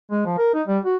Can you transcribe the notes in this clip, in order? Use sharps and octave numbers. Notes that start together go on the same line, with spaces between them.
G#3
F3
A#4
D#4
G3
F#4